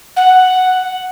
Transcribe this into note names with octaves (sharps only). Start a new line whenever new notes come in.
F#5